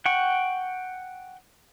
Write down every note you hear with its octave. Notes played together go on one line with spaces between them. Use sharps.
F#5 G5 C#6